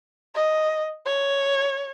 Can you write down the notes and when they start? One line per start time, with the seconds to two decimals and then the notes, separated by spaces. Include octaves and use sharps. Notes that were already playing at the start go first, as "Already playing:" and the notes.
0.35 D#5
1.06 C#5